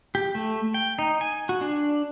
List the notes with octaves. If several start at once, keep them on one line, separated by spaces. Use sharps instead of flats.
G4
A3
G5
D#4
G#5
F#4
D4